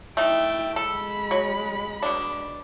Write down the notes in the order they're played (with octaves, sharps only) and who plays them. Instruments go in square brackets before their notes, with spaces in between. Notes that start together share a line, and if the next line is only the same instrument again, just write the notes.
[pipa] A3 D#4 [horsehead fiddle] E4 G5
[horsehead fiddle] G#3 B5 [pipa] A4
[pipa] F#3
B2 D4